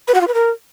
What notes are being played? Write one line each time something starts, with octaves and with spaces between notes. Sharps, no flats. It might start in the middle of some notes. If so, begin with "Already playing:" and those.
B4
F#4
F4
B4
A#4